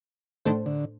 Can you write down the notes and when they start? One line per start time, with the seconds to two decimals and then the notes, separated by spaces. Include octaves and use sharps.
0.45 A2 D#3 A3 D4 A4 C5
0.66 D3